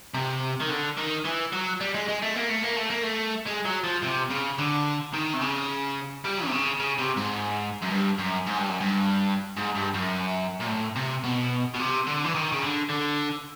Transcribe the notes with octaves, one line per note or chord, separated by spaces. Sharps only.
C3
D#3
D3
D#3
E3
F#3
G3
G#3
G#3
A3
A#3
A3
A#3
A3
A#3
A3
G#3
F#3
F3
C3
C#3
D3
D#3
C3
C#3
G3
C3
C#3
C#3
C3
G#2
F#2
G2
F#2
G#2
G2
F#2
G2
G#2
G2
F#2
A#2
A2
C3
B2
B2
C3
D3
E3
D#3
C#3
D3
D3